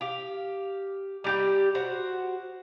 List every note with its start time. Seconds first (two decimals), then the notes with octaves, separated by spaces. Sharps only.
0.01 G4 F5
1.24 G3 G4 G5
1.75 F#4 C5